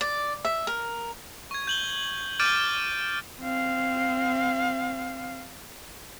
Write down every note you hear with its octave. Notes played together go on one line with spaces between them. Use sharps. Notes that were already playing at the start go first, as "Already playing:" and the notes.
D5
E5
A#4
C#6 G#6
G6 F#7 G7
D6 F6 G6 A6 D7 D#7
C4 F5